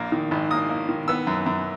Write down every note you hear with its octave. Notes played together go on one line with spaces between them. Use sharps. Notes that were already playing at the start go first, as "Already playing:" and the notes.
Already playing: A#1 A#3
D#3
G#1
A#3 D#6
A#3
D#3
B3 E6
F#2
F#2